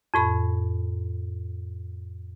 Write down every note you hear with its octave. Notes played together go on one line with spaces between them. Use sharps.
F2 A2 B5